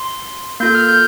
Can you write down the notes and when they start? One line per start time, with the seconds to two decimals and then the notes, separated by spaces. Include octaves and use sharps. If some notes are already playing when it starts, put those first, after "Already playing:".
Already playing: C6
0.60 A#3 F4 A4 G6
0.75 F6
0.89 G6